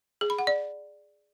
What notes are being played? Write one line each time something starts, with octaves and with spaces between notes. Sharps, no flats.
G#4
B5
F#5
D5